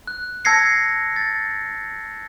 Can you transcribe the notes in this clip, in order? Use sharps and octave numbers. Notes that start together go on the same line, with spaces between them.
F#6
A5 E6 G#6 A#6 C7 C#7
A6